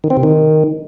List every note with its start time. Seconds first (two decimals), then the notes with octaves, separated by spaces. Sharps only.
0.04 D#3
0.10 C4
0.17 C3
0.23 D#3